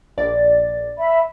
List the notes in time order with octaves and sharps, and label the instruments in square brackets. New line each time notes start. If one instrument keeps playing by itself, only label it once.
[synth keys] A#1 D5 A6
[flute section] E5 B5